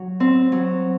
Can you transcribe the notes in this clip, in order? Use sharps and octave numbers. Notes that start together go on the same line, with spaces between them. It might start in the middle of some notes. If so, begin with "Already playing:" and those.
Already playing: F#3
C4
F#3